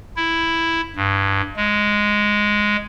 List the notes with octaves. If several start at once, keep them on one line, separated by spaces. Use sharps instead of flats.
E4
G2
G#3